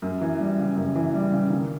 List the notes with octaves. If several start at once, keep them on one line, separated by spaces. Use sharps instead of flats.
F#2
E3
G3
C#3
F#2
E3
G3
C#3
D#3